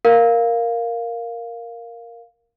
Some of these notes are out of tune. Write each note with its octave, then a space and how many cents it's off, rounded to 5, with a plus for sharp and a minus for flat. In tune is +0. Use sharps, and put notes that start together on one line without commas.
A#4 +0 F5 +0